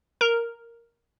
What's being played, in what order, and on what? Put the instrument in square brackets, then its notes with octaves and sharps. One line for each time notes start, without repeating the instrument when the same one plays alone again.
[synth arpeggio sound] A#4